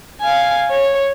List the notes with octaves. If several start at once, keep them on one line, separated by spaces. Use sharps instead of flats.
F5 G#5
C#5